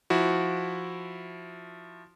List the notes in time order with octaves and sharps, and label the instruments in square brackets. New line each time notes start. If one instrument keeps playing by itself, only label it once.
[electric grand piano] F3 E4 F#4